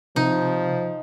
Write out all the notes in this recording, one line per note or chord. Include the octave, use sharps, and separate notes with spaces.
C3 F3 D#4